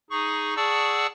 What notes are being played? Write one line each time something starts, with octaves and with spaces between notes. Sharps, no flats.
D#4 G#4 C#6
G#4 D5 F#5 A5 C#6 E6